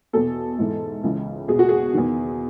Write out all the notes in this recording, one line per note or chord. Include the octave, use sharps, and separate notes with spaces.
E2 B2 A4
G#2 E3
C#2 C#3 E3
E2 B2 G#4
F#4
G#4
E2 D#3